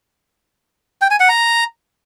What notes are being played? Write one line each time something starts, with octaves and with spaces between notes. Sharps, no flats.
G5
G#5
F#5
A#5